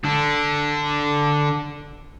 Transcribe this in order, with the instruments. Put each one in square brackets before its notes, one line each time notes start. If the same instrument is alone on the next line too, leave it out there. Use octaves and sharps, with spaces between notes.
[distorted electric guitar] D3 D4